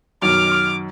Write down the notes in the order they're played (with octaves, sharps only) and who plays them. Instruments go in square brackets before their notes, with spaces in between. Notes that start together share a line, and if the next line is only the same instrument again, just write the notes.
[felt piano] F#2 B2 D#3 [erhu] D6 [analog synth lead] F6